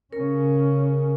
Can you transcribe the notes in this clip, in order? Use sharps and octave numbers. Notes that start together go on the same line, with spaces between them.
C#3 C#4 A#4